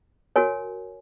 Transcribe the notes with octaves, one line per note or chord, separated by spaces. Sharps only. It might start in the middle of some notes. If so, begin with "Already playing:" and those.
F#4 A#4 C#5 G#5